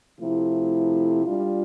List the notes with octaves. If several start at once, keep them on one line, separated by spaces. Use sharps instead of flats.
C3 F3 A3 E4
G3 D4 F4